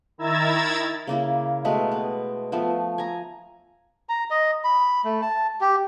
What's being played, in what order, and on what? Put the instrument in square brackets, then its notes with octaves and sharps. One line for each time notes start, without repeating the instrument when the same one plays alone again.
[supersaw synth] D#3 E4 A#5 E6 G#6 A6
[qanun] C#3 A#3 E4
B2 G#3 A3 B4
B3
F3 A3 B3
G#5 A#5
[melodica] A#5
D#5
B5
A3
A5
G4